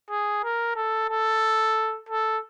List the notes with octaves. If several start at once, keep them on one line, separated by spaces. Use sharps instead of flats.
G#4
A#4
A4
A4
A4